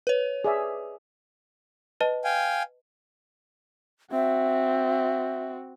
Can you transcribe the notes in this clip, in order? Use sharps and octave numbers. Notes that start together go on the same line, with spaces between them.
B4 C#5
G#4 D5 E5
B4 D#5 A5
F5 G5 G#5
C4 F#4 E5